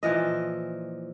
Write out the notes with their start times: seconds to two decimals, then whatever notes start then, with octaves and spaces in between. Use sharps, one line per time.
0.03 A#2 E3 F3 D#5